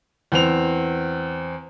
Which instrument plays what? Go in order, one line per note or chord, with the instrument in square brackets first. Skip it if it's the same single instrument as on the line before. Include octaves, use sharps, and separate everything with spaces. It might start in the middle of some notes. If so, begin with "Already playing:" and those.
[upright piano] E2 C4 F7